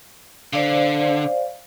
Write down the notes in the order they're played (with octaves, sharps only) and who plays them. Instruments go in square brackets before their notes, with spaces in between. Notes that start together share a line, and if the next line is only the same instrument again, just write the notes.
[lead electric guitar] D3 [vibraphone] C5 D5 F5